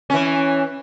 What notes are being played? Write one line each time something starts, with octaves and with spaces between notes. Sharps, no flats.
E3 C#4